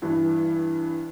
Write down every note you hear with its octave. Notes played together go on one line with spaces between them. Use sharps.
G2 E3 D4